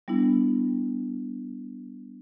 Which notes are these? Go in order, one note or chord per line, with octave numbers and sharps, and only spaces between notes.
G3 B3 D4 E4